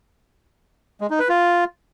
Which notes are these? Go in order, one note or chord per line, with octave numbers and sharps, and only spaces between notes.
G#3
D#4
B4
F4